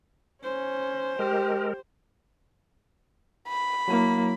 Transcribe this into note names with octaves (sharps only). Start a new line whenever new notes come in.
C#4 C5
G#3 G4 A#4
B5
F#3 A#3 E4